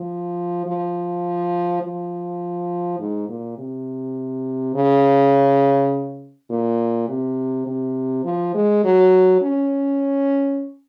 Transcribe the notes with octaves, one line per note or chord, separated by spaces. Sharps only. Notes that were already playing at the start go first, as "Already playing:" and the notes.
Already playing: F3
F3
F3
G#2
A#2
C3
C#3
A#2
C3
C3
F3
G#3
F#3
C#4